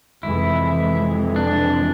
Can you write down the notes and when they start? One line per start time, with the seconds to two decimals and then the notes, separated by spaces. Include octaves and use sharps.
0.23 F2 C3 E3 G#3 E4
1.36 D4